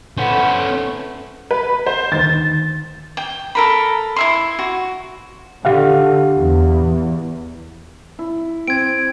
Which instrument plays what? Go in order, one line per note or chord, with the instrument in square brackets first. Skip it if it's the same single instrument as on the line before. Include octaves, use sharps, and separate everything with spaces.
[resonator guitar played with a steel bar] A3 B3 E4 [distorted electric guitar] C#4 C5
[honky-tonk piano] B4
C5
[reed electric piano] D2 D#3 [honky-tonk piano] A6
[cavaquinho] G5
A4 A#4 B5
E4 E5 C6
F#4
[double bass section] D3 [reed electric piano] G4 F5 F#5
[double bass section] E2
[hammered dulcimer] E4
[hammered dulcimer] C4 [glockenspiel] G#6 D7